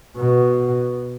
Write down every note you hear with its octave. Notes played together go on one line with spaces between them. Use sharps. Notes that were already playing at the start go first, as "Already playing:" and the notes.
B2